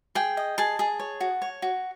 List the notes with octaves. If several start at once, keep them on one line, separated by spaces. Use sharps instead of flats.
G#4 G5
D#5
G#4 A5
G#4
C#5
F#4
C#5
F#4